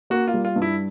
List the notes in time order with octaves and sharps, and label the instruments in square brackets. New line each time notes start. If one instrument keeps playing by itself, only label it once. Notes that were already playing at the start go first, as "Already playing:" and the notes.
[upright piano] A#3 [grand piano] F#4
[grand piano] F4
[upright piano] G3
[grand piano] F4
[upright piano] G2
[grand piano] E4